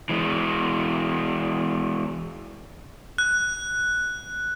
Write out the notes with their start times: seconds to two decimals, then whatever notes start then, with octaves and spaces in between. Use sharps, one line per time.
0.09 E3 G#3
3.18 F#6